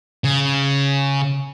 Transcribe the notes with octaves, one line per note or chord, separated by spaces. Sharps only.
C#3